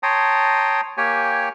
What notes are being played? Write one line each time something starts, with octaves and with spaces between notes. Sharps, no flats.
C#5 G5 A5 A#5 C6 D#6
A#3 G4 C#5 G5 G#5